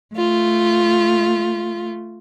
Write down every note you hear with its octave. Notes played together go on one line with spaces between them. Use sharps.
A3 F4